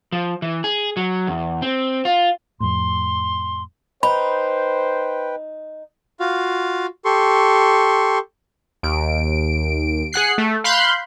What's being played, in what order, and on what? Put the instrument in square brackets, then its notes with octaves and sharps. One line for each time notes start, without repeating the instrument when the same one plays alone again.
[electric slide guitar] F3
E3
G#4
F#3
E2
C4
F4
[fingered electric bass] F2 A2 [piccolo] C6
[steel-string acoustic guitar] D#4 [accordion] B4 G5 [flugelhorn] C5 [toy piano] B5
[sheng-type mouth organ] F4 F#4 F5
G4 A4 C6 C#6
[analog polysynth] D#2 D7
G#4 F#5 F#6 C7
A3
F5 B5 C6 F#6 G6